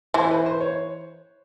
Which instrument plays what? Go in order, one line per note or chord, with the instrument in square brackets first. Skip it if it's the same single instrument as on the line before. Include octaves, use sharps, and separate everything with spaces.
[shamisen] E3 E4 [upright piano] C5
[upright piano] B4
C5
C#5